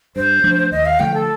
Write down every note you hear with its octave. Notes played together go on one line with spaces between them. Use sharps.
G2 C5
F3 A3 D4
D#2 D#5
F5
D3 F3 A3 G5
A4